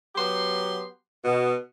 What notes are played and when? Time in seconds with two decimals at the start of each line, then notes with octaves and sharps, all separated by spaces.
0.15 F#3 B3 G4 C6
1.25 B2